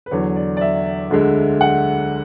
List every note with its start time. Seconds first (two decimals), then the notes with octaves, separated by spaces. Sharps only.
0.06 B4
0.11 E2 D3 F#3 C#5
0.36 D5
0.57 D5
0.61 E5
1.11 D2 D3 G#3
1.61 F#5